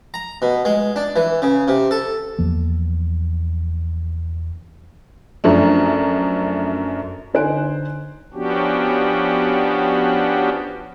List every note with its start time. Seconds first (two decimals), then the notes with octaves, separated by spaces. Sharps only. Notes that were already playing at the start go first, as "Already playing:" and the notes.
0.14 A#5
0.42 B2
0.65 G#3
0.96 D4
1.16 E3
1.42 C#3
1.68 C3
1.91 A4
2.39 E2 F3 A#3
5.44 F#2 F3 A3 D4
7.34 D3 D#4 C5 G#5 F#6 D7
8.34 F3 B3 C#4 D4 F#4 G4